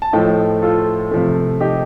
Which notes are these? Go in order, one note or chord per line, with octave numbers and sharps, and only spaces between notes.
A5
A2 F3 A3 D#5 G5
F4 A4
C3 F3 A3
D#4 G4